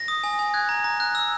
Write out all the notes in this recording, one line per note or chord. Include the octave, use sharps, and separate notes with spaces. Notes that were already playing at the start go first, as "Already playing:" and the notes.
Already playing: A#6
D#6
G#5
G#5
F#6 G#6
A#5
A#5
F#6
E6